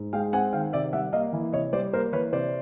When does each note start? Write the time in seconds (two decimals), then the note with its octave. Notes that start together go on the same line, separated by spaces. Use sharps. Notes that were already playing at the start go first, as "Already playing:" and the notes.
Already playing: G#2
0.13 G#3 F5 G5
0.33 C4 F#5 G#5
0.53 D#3 F5 G5
0.73 C3 D5 E5
0.93 G3 E5 F#5
1.13 A#3 D#5 F5
1.33 E3
1.53 C3 C#5 D#5
1.73 G3 C5 D5
1.93 A#3 A#4 C5
2.13 E3 B4 C#5
2.33 C3 C5 D5